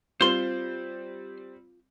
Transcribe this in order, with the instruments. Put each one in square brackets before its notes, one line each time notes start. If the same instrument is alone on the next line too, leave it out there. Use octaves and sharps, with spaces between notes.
[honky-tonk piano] G3 C4 [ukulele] F4 [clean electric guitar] C5 C6